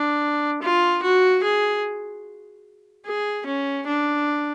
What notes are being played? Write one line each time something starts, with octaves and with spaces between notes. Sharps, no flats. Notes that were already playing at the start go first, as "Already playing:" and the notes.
Already playing: D4
F4
F#4
G#4
G#4
C#4
D4